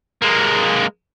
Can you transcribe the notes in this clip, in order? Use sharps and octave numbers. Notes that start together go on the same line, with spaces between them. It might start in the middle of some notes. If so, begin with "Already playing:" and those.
G#3 A#3